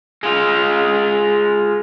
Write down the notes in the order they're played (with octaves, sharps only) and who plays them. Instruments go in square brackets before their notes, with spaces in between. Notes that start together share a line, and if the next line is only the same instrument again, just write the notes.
[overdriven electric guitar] G#3 F4